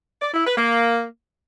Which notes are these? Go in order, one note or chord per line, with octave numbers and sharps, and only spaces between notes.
D5
E4
B4
A#3